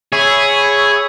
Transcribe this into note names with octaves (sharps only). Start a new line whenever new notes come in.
G#4 C#5 E5 B5